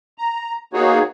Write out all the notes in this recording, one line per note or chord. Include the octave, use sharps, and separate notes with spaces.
A#5
A#3 B3 D#4 F#4 G#4 C#5